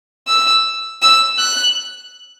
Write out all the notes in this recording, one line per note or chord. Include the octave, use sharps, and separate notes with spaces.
E6
E6
F#6